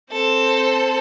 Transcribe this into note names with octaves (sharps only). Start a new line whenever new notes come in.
C4 A4 C5